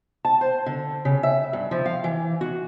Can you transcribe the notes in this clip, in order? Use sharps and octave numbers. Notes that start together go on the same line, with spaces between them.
A5
C5
D3
C#3
E5
G2
F3
F5
E3
F#4